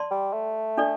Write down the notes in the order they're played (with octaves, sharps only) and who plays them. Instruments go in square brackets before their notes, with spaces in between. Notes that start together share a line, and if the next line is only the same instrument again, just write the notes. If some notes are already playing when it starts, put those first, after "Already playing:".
Already playing: [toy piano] D5 A5 C6
[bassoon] G3
A3
[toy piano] D4 A4 D5